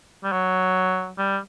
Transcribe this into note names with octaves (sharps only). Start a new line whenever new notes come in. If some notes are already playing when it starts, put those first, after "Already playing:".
G3
F#3
G3